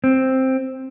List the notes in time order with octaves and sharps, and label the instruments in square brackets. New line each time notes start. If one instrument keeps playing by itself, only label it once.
[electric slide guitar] C4